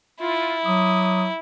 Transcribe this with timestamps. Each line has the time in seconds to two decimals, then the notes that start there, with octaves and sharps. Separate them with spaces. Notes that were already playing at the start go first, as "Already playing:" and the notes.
0.21 E4 F4
0.65 F#3 D6 D#6